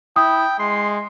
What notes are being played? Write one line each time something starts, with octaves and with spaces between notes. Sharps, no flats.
E4 G5 D#6
G#3 C6